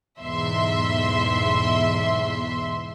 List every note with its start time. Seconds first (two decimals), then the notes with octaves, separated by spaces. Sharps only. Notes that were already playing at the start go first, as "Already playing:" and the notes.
0.20 B1 E2 G#2 E5 C6